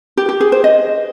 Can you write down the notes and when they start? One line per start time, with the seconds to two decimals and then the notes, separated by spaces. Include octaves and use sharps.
0.17 G4
0.29 G4
0.41 G#4
0.52 C5
0.64 D#5